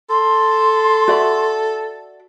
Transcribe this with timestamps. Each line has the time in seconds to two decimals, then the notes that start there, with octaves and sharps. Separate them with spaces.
0.10 A4 C6
1.08 F#4 D5 E5